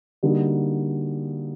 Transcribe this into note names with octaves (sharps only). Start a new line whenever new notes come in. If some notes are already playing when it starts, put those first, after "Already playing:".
D3 G3 A#3 D#4 F#4